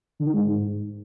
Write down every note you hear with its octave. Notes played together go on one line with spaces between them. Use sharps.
D3
D#3
G#2